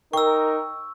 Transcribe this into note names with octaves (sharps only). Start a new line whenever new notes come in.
D#4 A#4 G5 C#6 E6